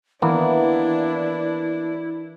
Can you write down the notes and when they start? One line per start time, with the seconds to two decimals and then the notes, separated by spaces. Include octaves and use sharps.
0.22 E3 A#3 B3 D4 E4